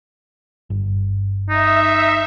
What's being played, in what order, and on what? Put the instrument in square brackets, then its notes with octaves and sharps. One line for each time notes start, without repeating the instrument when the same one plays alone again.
[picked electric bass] G1
[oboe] D#4 [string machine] E5